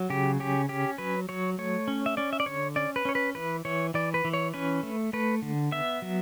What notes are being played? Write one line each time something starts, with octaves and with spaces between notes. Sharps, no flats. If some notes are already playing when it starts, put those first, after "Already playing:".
Already playing: F#3
C#3 G4
C#4 G4
C#4 G4
F#3 B4
F#3 C#5
A3 C#5
C#4
E5
C#4 D5
E5
D5
D3 C#5
C#4 D5
B4
C#4 C#5
B4
E3 B4
E3 C#5
E3 D5
B4
E3
C#5
C#4 B4
A3
A3 B4
D3
B3 E5
F#3